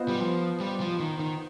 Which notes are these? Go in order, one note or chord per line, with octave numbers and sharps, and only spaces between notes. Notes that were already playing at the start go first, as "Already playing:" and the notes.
Already playing: B3 F4 C5 D#5
G3
F3
G3
F3
D#3
D#3